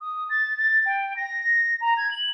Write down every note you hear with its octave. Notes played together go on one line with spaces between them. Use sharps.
D#6
A6
A6
G5
A#6
A#5
G#6
F#7